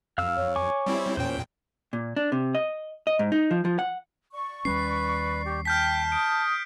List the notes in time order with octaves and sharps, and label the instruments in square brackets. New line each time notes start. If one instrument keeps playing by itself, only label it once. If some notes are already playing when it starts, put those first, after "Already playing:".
[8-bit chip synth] F2 [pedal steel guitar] F5 E6 F6
[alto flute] C#5
[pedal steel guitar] G#5 C#6 D6
[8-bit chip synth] G3 C4 E4
[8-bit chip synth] E2 A#2 G5 [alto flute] C#4 [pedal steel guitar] C5
[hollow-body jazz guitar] A#2
D4
C3
D#5
D#5
G#2
D#4
F3
F3
F#5
[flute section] D5 C#6
[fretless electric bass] D#2 G3 C#4 [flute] B4 [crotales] C7
[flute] G4
[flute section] G5 [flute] A5 [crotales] F6 G6 B6
[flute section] D#6 [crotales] D7